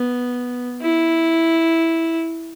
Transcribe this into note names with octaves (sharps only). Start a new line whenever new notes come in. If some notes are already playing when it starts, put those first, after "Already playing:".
Already playing: B3
E4